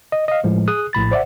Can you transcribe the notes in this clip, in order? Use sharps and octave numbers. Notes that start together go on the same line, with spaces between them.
D#5
D#5 F5
A2 F3 G#3
G#4 D#6 F#6
A#1 A2 B5 A6
C5 D5 E5 F#5